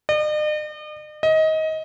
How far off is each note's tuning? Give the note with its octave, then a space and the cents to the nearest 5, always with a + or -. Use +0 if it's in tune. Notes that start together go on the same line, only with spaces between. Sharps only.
D#5 -45
D#5 +20